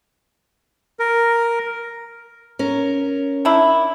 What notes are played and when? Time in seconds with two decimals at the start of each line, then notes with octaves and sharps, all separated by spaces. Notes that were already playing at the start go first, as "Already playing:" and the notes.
0.99 A#4
2.59 C#4 A#4
3.45 D#3 D4 E4